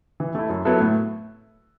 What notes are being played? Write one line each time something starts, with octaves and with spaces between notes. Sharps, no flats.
E3
A3 E4
F#2
F#3 B3 E4 A4
A2